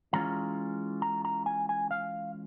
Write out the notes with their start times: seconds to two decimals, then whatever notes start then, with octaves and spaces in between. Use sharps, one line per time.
0.13 E3 G#3 C#4 F4 A#5
1.02 A#5
1.25 A#5
1.46 G#5
1.69 G#5
1.91 F5